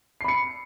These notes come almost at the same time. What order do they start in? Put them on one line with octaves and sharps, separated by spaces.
C7 B5 C#7